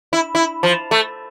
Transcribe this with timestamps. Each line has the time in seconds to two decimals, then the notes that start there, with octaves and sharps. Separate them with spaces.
0.13 E4
0.35 E4
0.63 F3
0.91 A3